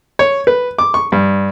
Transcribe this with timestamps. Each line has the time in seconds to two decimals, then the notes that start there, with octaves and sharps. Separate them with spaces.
0.19 C#5
0.47 B4
0.79 D6
0.94 C#6
1.12 G2